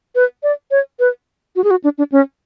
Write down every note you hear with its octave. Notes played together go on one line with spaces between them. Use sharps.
B4
D5
C#5
B4
F#4
G#4
F#4
D4
D4
C#4